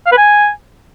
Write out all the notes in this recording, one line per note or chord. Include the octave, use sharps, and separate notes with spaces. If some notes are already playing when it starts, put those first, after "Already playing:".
F5
B4
G#5